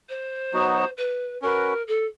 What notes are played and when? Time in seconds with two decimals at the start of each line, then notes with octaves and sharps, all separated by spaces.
0.09 C5
0.53 F#3 B3 D#4 F#4
0.97 B4
1.42 C#4 F#4 A#4 B4
1.88 A4